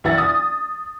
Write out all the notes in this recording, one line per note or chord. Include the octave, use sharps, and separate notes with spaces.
A#1 E3 E4 E5 F#5 A6
D#6